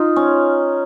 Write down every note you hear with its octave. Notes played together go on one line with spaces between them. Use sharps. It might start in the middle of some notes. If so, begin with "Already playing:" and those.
Already playing: D#4 F4
C#4